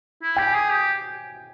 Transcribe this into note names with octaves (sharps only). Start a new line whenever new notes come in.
E4
G4 G5
G#5
G#4
G4